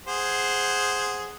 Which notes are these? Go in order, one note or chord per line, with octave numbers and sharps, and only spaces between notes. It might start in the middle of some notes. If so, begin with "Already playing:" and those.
G#4 C5 F#5